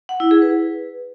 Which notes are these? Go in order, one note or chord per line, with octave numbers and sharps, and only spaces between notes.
F#5
E4
G#4
B4